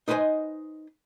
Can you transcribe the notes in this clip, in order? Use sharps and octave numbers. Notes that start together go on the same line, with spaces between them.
D#4 B4 C5 D#5 G#5